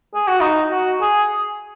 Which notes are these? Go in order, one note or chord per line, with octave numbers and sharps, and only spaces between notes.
G#4
F#4
D#4
F#4
G#4